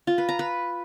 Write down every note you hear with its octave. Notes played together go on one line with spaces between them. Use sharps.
F4
B4
A#5
B4